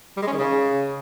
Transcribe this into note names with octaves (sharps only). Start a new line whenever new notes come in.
G3
G#3
C#4
D#3
C#3